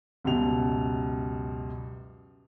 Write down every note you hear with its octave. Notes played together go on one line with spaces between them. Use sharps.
C#2 F#2 B2 G3 F7